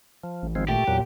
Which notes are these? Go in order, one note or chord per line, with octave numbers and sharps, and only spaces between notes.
F3
A1
G#1 F3 G#3 C4
A#2 A3 G4
E2 A#2 F#3